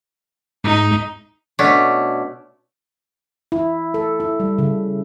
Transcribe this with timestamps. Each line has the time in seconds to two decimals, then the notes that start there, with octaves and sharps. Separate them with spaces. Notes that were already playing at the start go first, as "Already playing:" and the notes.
0.64 G#2 D#4
1.59 B2 A3 C#4 D4
3.52 E4
3.94 A4
4.20 E4
4.40 G3
4.58 C#3